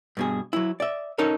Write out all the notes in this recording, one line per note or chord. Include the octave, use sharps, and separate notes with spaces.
G2 B2 G#4
F#3 E4
D5 E5
C#4 D#4 A4 A#4 C#5